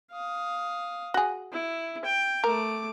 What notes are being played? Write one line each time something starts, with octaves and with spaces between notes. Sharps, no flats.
F5 D#6
F#4 G#4
E4
G5
A3 A#4 D6